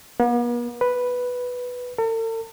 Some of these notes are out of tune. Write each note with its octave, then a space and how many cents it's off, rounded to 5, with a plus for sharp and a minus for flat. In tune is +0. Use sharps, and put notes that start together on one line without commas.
B3 -45
B4 +0
A4 +45